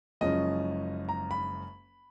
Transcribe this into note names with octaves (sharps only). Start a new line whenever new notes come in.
F#1 F#2 F3 G#3 C#4 D#5
A#5
B5